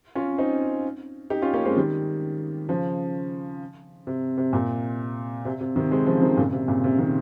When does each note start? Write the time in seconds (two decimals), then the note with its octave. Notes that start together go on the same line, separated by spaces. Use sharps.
0.15 C#4 F4
0.38 C4 D#4
1.30 D#4 G4
1.42 C#4 F4
1.53 A#3 C#4
1.65 G#3 C4
1.77 D#3 G3
2.69 C#3 F3
4.07 C3
4.38 C3
4.53 A#2
5.45 C3
5.61 C3
5.76 C3 D#3
5.92 G#3 C4
6.06 C#3 F3
6.22 C3 D#3
6.37 A#2 C#3
6.53 C3
6.68 A#2 C#3
6.84 C3
6.99 C3 D#3